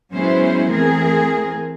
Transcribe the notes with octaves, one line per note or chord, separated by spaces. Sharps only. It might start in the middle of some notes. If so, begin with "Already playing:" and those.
F#3 G#3 B3 C#4 E4 C5
E3 A3 C4 G#4 A#4